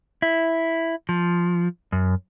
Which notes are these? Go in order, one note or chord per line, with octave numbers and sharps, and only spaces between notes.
E4
F3
F#2